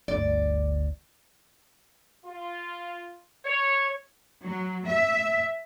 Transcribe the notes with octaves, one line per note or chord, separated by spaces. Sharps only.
G1 D2 D5
F4
C#5
F#3
E5